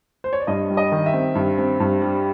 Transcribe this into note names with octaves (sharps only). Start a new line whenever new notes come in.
C5
C#5
D5
G2 D#5
G3
D#5
D#3
E5
C4
G2
C4
G2
G3